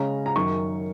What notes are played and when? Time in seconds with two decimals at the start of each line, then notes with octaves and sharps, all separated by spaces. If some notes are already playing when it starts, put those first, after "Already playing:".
Already playing: C#3 G#3 C#4 A#5
0.26 A#5
0.35 F#2 D#3 F#3 C#6